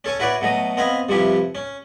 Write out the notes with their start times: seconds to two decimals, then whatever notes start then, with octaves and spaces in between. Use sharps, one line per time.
0.04 C#4 A4 C#5 G#5
0.20 E4 F#4 B4 C#5 D5
0.41 B2 F#3 A3 A#5 D#6
0.77 B3 C4 D#5 F5 G#5 B5
1.09 G2 C3 F3 E4 G4
1.55 C#4